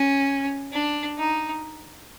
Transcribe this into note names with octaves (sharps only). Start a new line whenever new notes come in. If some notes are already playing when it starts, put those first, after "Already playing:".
Already playing: C#4
D4
D#4